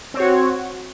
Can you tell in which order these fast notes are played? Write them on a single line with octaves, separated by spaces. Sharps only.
C4 C#5 F#4